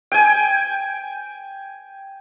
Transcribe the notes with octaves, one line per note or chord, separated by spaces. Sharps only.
G5 G#5